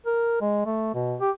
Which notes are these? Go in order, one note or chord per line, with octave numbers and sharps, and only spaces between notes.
A#4
G#3
A3
B2
G4